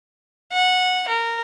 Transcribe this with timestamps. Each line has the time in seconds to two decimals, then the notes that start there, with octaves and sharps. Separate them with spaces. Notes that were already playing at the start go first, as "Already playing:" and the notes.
0.52 F#5
1.08 A#4